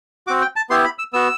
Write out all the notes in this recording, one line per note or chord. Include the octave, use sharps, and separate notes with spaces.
C4 F#4 D6
G5
A5
B3 E4 G4 C6
B5
E6
B3 F#4 E6